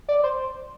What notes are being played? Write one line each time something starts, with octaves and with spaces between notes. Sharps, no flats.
D5
C5